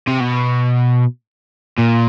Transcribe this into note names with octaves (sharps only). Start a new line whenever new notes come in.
C3
B2
A#2